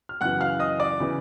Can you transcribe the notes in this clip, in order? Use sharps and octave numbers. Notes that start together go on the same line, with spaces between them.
F6
F#2 C#3 E3 F#5 F#6
F5 F6
D#5 D#6
D5 D6
C#3 E3